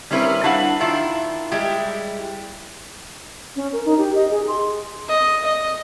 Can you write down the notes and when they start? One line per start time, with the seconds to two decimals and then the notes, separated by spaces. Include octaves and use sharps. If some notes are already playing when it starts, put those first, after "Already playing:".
0.11 G3 C4 C#4 E4 A#4 B4
0.43 D4 E4 F#4 F5 F#5
0.80 D#3 D4 E4 F4
1.51 G3 G#3 E4 G4
3.56 C#4
3.73 A#4
3.85 D#4
3.98 G4
4.15 D#5
4.31 G#4
4.48 C6
5.08 D#5
5.44 D#5